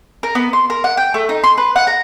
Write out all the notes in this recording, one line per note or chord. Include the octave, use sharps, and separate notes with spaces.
A#4
B3
C6
A#4
F#5
G5
A3
D#4
C6
B4
F#5
A#5